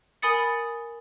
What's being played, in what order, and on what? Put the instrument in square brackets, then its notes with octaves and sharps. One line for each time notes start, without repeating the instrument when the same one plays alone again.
[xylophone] A#4 G#5 B5 D#6 A6 C#7